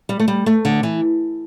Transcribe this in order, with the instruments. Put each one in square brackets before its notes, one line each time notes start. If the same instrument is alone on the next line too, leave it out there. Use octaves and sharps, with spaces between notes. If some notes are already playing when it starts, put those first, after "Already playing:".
[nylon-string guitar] G3
A3
G3
A3
D3
E3